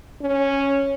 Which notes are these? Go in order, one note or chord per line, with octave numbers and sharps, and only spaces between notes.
C#4